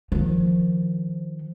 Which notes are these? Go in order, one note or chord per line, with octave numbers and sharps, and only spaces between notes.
D#3 F3